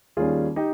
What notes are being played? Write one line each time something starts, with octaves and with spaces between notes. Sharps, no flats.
D#2 D#3 G3 C#4 F4 G#4
D#4 G4